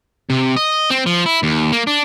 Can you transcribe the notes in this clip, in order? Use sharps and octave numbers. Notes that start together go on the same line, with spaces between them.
C3
D#5
C4
F3
E4
D#2
A#3
D4